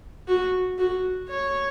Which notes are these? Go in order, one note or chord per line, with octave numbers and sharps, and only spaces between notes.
F#4
F#4
C#5